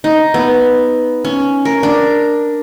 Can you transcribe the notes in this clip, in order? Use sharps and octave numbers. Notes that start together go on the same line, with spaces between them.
D#4
B3
C#4
A#4
D4